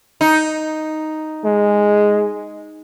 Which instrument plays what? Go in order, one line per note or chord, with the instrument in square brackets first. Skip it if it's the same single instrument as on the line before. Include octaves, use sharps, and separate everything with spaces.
[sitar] D#4
[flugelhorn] G#3